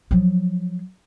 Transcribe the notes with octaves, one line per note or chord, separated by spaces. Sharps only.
F3 F#3